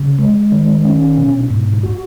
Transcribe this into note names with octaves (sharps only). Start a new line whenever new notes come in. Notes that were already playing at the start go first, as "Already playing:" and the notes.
Already playing: C#3
G#3
D#3
C#4
B2
G#2
F#4